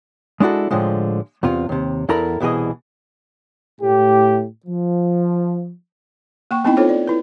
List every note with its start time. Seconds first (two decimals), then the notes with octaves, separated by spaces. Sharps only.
0.40 G#3 D4 E4 F#4 A4
0.71 A2 D3 F3 G#3
1.43 E2 C3 F4
1.69 D#2 C3
2.09 E2 E4 A4 A#4 A#5 B5
2.40 C2 B2 E3 G#4 D#5
3.81 A2 G4
4.66 F3
6.51 A#3 G5 C#6
6.65 B3 C4 D#4 E4 D#5 G5
6.77 D#4 F4 A4 C5 C#5
6.89 D5
7.07 E4 B4